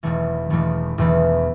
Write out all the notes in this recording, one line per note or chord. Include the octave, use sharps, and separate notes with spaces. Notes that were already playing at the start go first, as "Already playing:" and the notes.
E1 E2 E3 A3
E1 E2 E3 A3
E1 E2 E3 A3